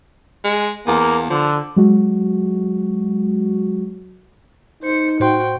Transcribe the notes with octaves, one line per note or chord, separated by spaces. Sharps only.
G#3
E2 A#3
D3 F3
F#3 G#3 F#4
D#4 C5 C#7
A2 F#4 C5 G5 C6